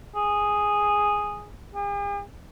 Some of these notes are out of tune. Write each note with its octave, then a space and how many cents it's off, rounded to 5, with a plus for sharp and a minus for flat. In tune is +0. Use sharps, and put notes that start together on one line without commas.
G#4 -5
G#4 -45